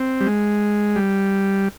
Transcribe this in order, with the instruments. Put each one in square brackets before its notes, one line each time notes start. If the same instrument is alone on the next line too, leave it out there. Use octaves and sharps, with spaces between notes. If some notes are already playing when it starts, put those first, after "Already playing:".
Already playing: [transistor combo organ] C4
G3
G#3
G3